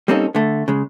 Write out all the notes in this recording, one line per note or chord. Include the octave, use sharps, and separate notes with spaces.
G3 A#3 C4 C#4 D#4 A4
D3 A3
C#3 G#3